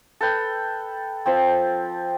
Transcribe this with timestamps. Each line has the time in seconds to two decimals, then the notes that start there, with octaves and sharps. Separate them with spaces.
0.21 A4 B4 G5
1.26 F3 C4